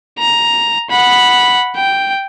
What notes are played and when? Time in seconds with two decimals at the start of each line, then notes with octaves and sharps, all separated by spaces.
0.19 A#5
0.89 F#5 B5
1.76 G5